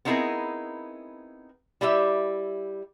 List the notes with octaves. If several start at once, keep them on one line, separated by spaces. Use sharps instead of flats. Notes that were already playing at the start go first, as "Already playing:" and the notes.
B3 C4 D#4 E4 G#4 A#4
G3 E4 G4 E5